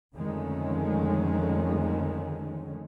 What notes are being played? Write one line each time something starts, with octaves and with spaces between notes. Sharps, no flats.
F2 D3 D#3 G#3 A3 C#4